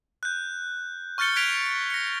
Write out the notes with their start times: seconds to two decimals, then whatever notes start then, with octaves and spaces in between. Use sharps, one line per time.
0.23 F#6 G6
1.18 C#6 F6 G6 A6 C#7 G7
1.36 F#6 G#6 B6 D7 F7
1.90 A#6 C#7